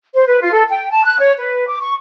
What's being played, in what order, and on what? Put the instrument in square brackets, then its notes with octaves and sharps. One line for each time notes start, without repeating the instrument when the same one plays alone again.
[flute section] C5
B4
F4
A4
G5
A5
F#6
C#5
B4
D6
C#6